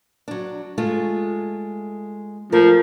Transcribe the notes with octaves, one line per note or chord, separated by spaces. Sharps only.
F#3 D4
G#3 A3 F4
F3 A3 A#4